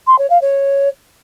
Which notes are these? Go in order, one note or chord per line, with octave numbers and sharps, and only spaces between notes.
C6
C#5
F5
C#5